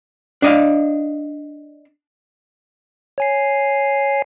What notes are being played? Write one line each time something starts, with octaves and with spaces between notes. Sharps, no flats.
D4 D#5 F5
C#5 G#5 C7